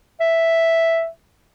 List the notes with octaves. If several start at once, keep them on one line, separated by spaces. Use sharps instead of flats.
E5